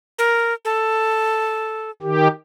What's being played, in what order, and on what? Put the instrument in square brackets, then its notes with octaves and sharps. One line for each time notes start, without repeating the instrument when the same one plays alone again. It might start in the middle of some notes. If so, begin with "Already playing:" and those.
[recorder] A#4
A4
[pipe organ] D#3 G4